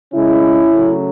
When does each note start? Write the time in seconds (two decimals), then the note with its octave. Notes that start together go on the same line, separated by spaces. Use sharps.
0.13 C#3 G#3 C#4 E4
0.71 C#3 F#3 A3